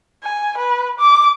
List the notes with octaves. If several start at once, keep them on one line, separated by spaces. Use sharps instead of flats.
G#5
B4
D6